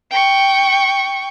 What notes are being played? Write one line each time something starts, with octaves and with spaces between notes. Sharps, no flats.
G5 C#6